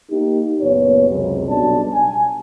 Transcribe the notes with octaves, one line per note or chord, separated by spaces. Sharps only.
A#3 D#4 G4
F#1 A#2 B3 C#5
C#2 F#2 C3
B1 B2 G3 D4 D5 A5
G#5